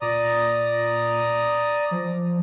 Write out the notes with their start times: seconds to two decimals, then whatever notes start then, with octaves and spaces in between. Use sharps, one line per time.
0.02 A#2 D5 A#5 D#6
1.91 F3